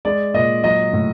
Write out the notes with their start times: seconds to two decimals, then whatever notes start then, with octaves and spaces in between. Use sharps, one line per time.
0.05 G#3 D5
0.34 A#2 D#5
0.64 F#3 D#5
0.93 A2